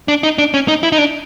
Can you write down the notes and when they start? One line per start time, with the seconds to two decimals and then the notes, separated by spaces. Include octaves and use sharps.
0.08 D4
0.23 D#4
0.38 D4
0.54 C#4
0.68 D#4
0.83 E4
0.92 D#4
0.98 D4